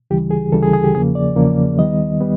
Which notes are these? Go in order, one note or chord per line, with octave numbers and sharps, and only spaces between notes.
D2 C#3 E3 G3 G4
G#4
D2 C#3 E3 G3 A4
G#4
G#4
G4
E2 C#3 F3 A#3 G#4
D5
E2 C#3 F3 A#3
D#2 D#3 G3 B3 D#5
G3 B3